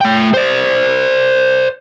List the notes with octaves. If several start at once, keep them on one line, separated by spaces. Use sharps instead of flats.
A3 G5
C5 D5